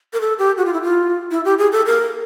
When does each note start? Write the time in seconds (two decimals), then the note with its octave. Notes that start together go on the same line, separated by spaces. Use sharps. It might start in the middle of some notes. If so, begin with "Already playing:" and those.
0.13 A#4
0.21 A4
0.39 G4
0.57 F#4
0.65 F4
0.73 E4
0.82 F4
1.31 E4
1.45 G4
1.58 G#4
1.72 A4
1.86 A#4